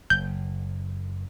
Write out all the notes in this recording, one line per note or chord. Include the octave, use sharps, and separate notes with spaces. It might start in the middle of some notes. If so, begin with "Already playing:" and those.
F#1 G6